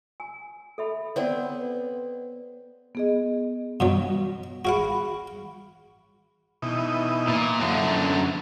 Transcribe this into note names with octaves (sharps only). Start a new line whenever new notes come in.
G#5
A4 E5 B5
B3 C4 C#5 D5 F#5
B3 G#4 D#5
G2 B2 F#3
F#4 G#4 F5 F#5 B5
B2 E3 D#4
A#2
F#2 D3 F#3